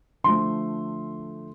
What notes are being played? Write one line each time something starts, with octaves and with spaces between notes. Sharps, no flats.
D3 F3 A3 C6